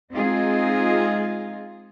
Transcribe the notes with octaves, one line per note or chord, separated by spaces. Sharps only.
G#3 C4 D#4 F4 G#4